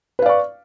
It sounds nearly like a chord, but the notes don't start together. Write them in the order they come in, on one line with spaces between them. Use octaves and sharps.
B4 F5 D5 C#6